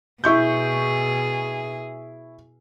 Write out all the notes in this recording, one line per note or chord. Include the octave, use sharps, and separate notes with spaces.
B2 E4 G#4 C#6 G6